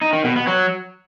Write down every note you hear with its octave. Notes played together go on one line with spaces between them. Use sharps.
D#4
D#3
B2
B3
F#3